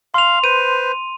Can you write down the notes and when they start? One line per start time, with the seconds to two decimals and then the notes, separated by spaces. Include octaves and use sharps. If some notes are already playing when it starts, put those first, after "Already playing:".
0.14 F5 C6 F7
0.44 B4 C5 D#7